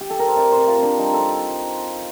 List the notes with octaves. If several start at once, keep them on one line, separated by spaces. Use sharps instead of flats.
G4
A4
A#4
C5
C3 D5
C5
C3
F4
C4 D4
G3 D#4
C4 A4